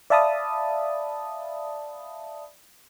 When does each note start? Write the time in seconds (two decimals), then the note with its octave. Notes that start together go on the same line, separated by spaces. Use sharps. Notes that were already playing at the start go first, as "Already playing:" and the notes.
0.10 D5 E5 F5 A5 B5 D#6